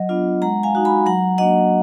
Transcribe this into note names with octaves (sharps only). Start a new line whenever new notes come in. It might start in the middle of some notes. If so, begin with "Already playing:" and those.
Already playing: F#3 D#5 F#5
B3 D4 F4
G#3 F#5 A#5
F5 G#5
D#4 F#4
G#5 B5
F#3 F#5 A#5
A#3 D4 F#4 D#5 F#5